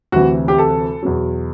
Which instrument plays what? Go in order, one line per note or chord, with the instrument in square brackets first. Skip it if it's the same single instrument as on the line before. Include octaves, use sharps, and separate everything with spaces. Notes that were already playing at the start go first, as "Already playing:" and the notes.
[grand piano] D2 C3 E3 F#4
G4
A4
E2 B2 F#3